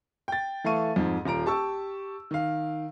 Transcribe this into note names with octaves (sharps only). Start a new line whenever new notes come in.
G5 A6
E3 A3 A4 F5 C#6 D#7
F2 G#2
D#1 F4 A#5 D7
G4 A5 C#6 E6
D#3 F5